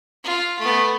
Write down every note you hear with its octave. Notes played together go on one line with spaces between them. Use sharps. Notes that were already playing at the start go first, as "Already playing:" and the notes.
F4
A3 B3